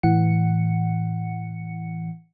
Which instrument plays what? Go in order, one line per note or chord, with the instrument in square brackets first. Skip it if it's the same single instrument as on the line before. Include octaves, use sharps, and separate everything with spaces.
[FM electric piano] A2 E3 F#5 C#7